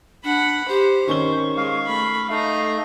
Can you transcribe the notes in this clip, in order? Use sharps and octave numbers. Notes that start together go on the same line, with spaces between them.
D4 F#5 B5
G4 C5
D#3 C#4 C#6 G7
G#3 F5
A3 B5
A3 D#4 F5 A#5